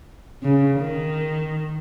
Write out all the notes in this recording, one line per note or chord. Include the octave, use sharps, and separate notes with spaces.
C#3
D#3